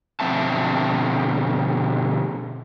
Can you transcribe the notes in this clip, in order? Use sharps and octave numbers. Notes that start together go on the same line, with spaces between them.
B2 D3 F3 C4 E5 A5